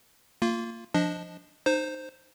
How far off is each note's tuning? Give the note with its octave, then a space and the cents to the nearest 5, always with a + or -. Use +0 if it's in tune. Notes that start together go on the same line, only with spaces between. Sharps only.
A#3 -25 F4 +0
F3 +0 D4 +0 D#5 +0
D#4 -25 C5 +0